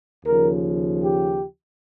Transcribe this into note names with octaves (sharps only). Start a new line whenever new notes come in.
D#2 C#3 F3 A#4
G4